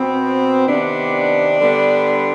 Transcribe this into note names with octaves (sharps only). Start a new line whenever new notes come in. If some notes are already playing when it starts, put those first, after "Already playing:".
Already playing: B2 B3 C4
C3 D#3 B3 D4
D3 G3 B3